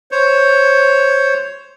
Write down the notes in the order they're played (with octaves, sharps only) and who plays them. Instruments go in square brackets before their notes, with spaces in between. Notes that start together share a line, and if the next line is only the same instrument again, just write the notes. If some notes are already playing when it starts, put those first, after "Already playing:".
[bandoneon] C5 C#5